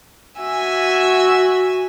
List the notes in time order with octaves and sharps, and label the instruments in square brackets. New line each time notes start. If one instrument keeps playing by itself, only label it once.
[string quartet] F#4 E5 G#5 E6